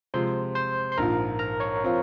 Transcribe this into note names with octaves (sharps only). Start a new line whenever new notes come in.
C3 F3 G#3 C5 C6
C5 C6
C6
A#1 G#2 F3 A#4 A#5
A#4 A#5
C#5 C#6
F3 C4 F4